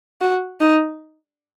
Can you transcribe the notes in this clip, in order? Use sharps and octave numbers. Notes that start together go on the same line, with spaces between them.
F#4
D#4